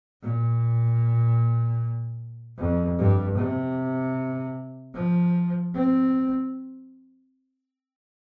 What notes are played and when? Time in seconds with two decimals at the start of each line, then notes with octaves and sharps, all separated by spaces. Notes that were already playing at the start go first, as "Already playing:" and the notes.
0.22 A#2
2.58 F2
2.98 G2
3.37 C3
4.94 F3
5.74 C4